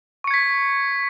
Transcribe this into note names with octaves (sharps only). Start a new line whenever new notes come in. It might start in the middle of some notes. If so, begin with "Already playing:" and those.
C#6 G#6 B6 C#7